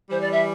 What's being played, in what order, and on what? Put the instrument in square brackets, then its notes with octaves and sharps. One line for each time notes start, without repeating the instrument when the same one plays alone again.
[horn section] E3 G3 [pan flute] C5
[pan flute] D5
E5